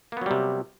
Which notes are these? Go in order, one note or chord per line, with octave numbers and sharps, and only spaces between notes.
C3 F#3 G3 A#3 B3